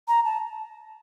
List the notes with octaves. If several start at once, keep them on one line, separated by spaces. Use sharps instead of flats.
A#5
A5